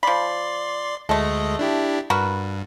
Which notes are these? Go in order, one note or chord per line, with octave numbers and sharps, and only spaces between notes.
F3 D5 B5 C6
D2 G#3 A3 A4 D#5
D4 E4 G4
G2 F#4 A#4 B4